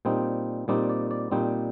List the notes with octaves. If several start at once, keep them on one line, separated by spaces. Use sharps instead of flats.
A#2 G3 C4 D#4 C5
A#2 G3 C4 D#4 D5
D5
D5
A#2 G3 C4 D#4 C5